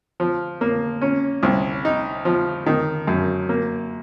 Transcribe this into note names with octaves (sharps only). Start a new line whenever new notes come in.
F3
A#3
C#4
C2
D#4
F3
D#3
F#2
A#3